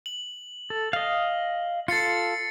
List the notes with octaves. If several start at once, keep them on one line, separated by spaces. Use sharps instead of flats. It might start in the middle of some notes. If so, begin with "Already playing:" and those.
F#7
A4
D#5 F5
F4 A4 A6 C7 C#7